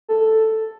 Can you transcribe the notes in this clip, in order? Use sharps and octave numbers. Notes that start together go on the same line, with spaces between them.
A4